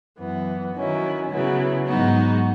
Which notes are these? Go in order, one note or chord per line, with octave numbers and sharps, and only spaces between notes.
F#2 E3 B3
D#3 F#3 C#4 E4
C#3 F#3 B3 E4
G#2 F#3 B3 D#4 F#4